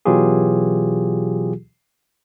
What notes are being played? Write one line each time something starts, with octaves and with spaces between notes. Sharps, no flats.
B2 E3 F#3 F4 G4 G#4